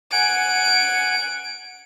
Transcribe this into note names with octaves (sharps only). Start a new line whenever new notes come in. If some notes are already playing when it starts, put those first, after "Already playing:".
F#5 G#5 D7